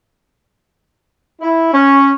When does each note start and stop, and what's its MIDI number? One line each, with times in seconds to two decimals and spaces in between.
1.41 1.69 64
1.73 2.11 61